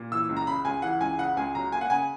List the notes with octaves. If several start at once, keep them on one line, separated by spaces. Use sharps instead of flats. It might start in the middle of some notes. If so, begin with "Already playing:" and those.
Already playing: A#2
E3 E6
C#2
A#5
C#3 B5
C#2 G#5
E3 F#5
C#2 G#5
C#3 F#5
C#2 G#5
F#3 A#5
A#3 G#5
F#5
C#3 G#5